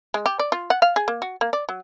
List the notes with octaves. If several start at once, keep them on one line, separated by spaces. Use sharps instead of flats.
G#3
G4
D5
F4
F#5
F5
G#4
A#3
F#4
A#3
D5
F#3